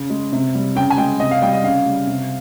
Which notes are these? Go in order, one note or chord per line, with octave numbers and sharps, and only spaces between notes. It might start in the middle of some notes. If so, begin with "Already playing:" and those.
Already playing: C#3
G#3
C3
G3
C#3 G5
G#5
G#3 G5
C3 D#5
F5
G3 G5
D#5
C#3 F5
G3
C3